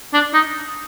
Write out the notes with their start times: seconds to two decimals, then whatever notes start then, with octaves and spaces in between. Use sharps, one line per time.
0.13 D4
0.34 D#4